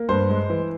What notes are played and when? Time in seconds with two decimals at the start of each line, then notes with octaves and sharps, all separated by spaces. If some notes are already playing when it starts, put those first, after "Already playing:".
Already playing: A#3
0.09 G2 C5
0.30 G#3
0.50 E3